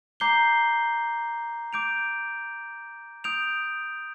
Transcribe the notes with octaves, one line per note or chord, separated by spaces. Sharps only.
A#5 D6 G6 C7 G7
D6 G6 D7 F7
D#6 G6 D7 F7